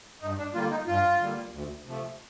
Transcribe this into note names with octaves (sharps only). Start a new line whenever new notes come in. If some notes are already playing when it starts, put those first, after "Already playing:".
G2 D#4
D4
D3 G3 A#3 F4
D#4
G2 F4
D3 G3 A#3
D2
C3 F3 A3